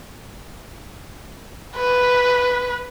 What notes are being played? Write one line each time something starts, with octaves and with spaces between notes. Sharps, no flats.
B4